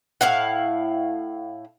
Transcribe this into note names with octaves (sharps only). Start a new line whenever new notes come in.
A2 E4 F5 F#5